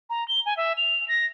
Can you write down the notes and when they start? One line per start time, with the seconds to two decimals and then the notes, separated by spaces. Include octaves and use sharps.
0.10 A#5
0.28 G7
0.46 G#5
0.57 E5
0.77 F7
1.08 A#6